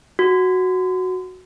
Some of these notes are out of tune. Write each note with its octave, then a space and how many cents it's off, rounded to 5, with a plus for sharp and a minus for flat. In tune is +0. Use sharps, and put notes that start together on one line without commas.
F#4 +0